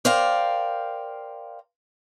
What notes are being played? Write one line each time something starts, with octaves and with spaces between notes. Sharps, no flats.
A#4 C5 D5 F5 G5